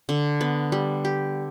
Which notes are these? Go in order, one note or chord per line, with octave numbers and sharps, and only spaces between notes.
D3
B3
G3
G4